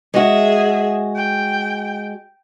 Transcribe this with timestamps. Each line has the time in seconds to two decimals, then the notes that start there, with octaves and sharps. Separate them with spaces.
0.14 G#3 F#4 G#4 E5
1.16 G5